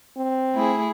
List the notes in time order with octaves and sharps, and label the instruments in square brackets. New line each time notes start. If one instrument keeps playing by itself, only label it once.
[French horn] C4
[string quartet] A3 E4 G#4